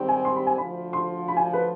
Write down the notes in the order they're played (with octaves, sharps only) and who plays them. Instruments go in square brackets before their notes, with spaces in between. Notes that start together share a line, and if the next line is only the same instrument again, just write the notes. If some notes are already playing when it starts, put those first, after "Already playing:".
Already playing: [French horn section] G#2 D#3 G3 C4 G4
[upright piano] G#5
C6
B5
G#5
[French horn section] D2 D3 F3 [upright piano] B5
[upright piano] C6
B5
G#5
B4